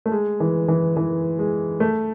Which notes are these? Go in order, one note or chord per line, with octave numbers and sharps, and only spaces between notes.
A3
G#3
E3
E3
E3
G#3
A3